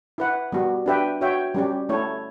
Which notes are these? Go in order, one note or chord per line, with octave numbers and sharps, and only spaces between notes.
E4 B4 F#5
G3 B3 F#4
D4 G4 B4 E5 G5
F#4 C#5 E5 G5
G3 C#4 G4
A3 E4 A4 C#5